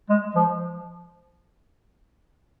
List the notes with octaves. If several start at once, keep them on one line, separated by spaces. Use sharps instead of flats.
G#3
F3